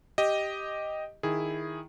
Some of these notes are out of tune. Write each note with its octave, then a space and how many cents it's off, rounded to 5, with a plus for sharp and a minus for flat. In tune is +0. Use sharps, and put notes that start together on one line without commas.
G4 +0 D#5 +0
D#3 +5 E4 +0 G#4 +0